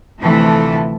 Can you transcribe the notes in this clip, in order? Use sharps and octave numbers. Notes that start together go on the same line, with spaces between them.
D2 C3 E3 F3 A3 A4